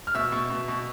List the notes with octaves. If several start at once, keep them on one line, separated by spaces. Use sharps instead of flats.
F6
B2 E5 E6
B2
B2
B2